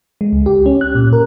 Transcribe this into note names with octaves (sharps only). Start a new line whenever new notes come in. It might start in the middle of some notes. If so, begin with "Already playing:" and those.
G#3
C#2
G4
C#4
F#6
A#2
A#4